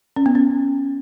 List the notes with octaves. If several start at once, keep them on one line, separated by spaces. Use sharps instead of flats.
C#4
B3
C#4